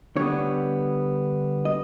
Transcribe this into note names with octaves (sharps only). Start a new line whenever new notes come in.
D3 G3 B3 C#5
D#5